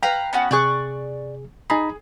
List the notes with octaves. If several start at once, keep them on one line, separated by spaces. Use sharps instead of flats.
B4 F5 G5 A#5
B3 C#4 F#4
C3 G#4 D5 C#6 F#6
D#4 G#4 A#5 B5